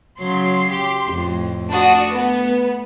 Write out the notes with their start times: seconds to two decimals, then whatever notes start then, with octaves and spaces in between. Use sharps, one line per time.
0.19 C#3 F#3 C6
0.72 G4
1.08 F2 A2
1.69 A3 D4 F#4 D#6
2.11 B3